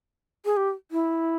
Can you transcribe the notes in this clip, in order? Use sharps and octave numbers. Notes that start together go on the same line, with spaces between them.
G#4
G4
E4